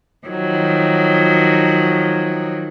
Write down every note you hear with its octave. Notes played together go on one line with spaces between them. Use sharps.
D#3 F3 F#3